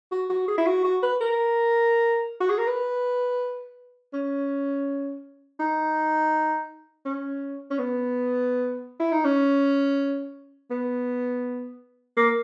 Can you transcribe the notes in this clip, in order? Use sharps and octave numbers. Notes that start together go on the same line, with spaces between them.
F#4
F#4
G#4
E4
F#4
F#4
B4
A#4
F#4
G#4
A#4
B4
C#4
D#4
C#4
C#4
B3
E4
D#4
C#4
B3
A#3